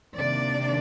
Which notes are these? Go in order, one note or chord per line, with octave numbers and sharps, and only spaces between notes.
C3 D#3 A#3 D4 D5